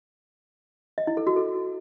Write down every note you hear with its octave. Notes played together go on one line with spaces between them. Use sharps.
D#5
E4
A4
F#4
A4